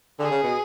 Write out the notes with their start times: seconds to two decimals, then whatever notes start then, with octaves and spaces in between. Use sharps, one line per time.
0.19 D3 G#4
0.31 C#3
0.43 B2